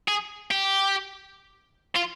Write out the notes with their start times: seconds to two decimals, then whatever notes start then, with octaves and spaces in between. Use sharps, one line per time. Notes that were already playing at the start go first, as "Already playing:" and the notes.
0.08 G#4
0.51 G4
1.96 F4